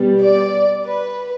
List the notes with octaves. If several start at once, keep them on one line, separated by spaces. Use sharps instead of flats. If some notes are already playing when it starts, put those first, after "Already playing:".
Already playing: B2 G3 B3
D5
B4